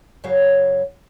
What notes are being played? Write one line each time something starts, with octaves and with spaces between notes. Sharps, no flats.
F#2 C#3 F#3 C#5 F5